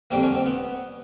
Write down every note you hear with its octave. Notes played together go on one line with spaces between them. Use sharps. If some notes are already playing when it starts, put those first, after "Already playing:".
F2 D3 G3 A#3 C4
C#4
C4
B3